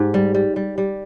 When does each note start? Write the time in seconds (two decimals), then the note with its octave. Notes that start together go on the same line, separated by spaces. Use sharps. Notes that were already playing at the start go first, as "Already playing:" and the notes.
Already playing: G#2 G4
0.14 G3
0.35 G3
0.56 G3
0.78 G3